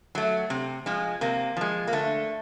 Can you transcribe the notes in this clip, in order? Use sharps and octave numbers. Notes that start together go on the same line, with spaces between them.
F#3 A3
C3
F3 G#3
C3 A#3
F3 G#3
A#3
D3 A3